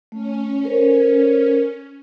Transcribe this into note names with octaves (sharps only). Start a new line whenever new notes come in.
A3 C#4
A4 A#4 C5